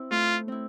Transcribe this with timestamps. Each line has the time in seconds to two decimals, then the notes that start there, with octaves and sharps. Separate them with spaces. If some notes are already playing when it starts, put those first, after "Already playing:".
Already playing: C4 E4
0.11 A3 F4
0.48 C4 E4